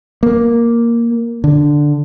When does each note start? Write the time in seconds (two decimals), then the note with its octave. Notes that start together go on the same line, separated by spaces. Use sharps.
0.23 A#3
1.44 D3